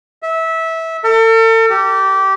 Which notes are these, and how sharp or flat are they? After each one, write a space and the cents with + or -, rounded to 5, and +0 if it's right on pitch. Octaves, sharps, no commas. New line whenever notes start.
E5 -20
A4 +40
G4 -20